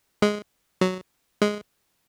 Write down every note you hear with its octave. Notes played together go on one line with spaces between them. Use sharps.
G#3
F#3
G#3